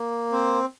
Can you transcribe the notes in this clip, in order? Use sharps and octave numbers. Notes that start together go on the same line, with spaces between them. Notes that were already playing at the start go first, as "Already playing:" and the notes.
Already playing: A#3
C4 C5